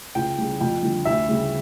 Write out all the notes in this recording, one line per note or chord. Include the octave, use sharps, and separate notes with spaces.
C#2 G5
C#3 G3
F2 G5
D3 G3
D2 E5
C#3 G3